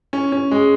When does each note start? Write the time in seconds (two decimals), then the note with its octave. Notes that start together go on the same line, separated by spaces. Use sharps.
0.13 C#4
0.32 C#4
0.51 G#3